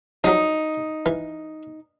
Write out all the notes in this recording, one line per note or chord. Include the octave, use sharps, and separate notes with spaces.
F3 F#3 D#4
E3